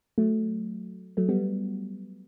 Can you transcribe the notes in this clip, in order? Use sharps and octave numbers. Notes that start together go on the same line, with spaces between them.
F#3 A3
F#3 A3
G3 B3